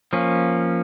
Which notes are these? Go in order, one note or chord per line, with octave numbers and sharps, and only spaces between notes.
F3 A#3 C#4